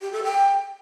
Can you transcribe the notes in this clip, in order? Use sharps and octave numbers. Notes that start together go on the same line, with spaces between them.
G4
A4
G5